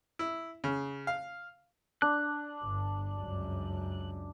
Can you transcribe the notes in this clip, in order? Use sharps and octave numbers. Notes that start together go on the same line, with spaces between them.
E4
C#3
F5
D4 F#6
G1 G2
C#2 F#2